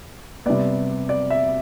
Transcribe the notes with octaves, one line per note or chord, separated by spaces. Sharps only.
C3 G3 B3 D5
D5
E5